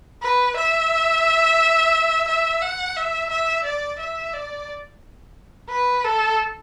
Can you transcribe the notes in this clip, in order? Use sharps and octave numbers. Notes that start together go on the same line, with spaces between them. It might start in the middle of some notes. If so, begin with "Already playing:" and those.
B4
E5
E5
F#5
E5
E5
D5
E5
D5
B4
A4